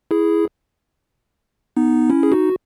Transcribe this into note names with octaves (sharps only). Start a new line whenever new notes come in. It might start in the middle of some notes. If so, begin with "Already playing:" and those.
E4 G#4
B3 D#4
C#4 E4
G#4
D#4 F#4